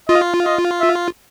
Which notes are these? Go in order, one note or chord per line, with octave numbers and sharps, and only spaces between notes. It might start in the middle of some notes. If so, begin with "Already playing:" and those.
F4 D#5
D#5
E5